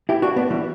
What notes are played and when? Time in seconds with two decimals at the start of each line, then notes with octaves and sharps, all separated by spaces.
0.09 E4 G4
0.22 D4 F#4
0.36 B3 D4
0.50 E3 G3